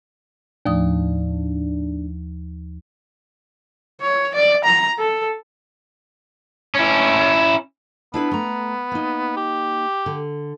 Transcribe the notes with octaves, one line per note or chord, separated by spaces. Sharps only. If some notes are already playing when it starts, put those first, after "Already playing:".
D#2 A2 F3 D4 D#6
C#5
D5
A#5
A4
C#4 E4
B3 D4 E4 B4
A3 A#5
A#3 D#4
G4
D3